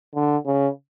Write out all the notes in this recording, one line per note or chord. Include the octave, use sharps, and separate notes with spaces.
D3
C#3